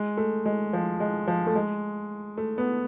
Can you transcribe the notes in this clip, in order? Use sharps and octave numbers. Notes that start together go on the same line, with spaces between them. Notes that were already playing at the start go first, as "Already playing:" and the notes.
Already playing: G#3
A3
G#3
F3
G#3
F3
A3
G#3
A3
B3